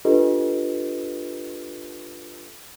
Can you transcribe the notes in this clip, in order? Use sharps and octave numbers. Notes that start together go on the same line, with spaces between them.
D4 F4 G4 A4 B4 D#5